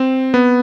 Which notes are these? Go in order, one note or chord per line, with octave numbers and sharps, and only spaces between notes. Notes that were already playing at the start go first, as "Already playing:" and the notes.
Already playing: C4
B3